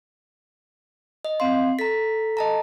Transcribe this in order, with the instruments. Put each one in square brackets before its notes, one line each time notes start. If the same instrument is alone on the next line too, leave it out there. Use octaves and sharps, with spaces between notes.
[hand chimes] D#5
[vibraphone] C4 F5 [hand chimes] C6
[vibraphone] A4 [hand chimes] A#5 B6
[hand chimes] D#5 A5 A#5